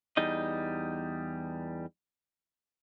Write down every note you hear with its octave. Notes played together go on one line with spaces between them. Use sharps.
E2 G3 D#4 D#5